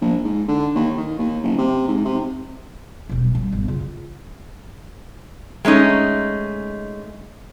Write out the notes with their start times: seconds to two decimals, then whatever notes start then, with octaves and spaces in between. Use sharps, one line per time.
0.01 A#1
0.24 G#2
0.48 D3
0.75 D#2
0.97 D#3
1.18 D#2
1.43 F#1
1.58 C3
1.88 G#2
2.05 C3
3.09 D#1 B1
3.35 G3
3.52 G1
3.68 C#3 F4
5.65 G#3 A3 C#4 D#4